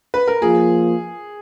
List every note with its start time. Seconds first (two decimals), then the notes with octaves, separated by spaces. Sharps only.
0.14 B4
0.28 A#4
0.42 F3 A#3 F4 G#4